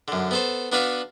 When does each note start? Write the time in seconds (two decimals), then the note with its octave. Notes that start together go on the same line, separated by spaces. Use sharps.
0.08 F#2 D3
0.31 B3 A4 C5
0.72 B3 D4 F#4 B4 F5